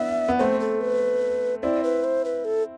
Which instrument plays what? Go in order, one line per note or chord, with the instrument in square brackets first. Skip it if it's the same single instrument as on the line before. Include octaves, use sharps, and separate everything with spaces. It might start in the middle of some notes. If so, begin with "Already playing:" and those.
Already playing: [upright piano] B3 D4 E4 [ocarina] E5
[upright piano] B3
[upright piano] A3 C4 [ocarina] C5
[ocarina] A4
B4
[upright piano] C4 E4 [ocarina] D5
[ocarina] B4
C5
B4
A4